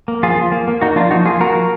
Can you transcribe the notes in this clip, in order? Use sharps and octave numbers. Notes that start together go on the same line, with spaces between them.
A#3
F3 F4 G#4
F3
A#3
A#3
A#3 D#4 F#4
F3 D4 F4
F3 D#4 F#4
A#3 F4 G#4
A#3 F#4 A#4
F3